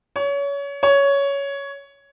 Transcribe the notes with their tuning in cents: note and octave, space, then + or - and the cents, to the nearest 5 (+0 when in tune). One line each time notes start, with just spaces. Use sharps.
C#5 +25
C#5 +10